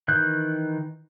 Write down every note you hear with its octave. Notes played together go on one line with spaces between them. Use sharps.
D#3 E3 F#6 G6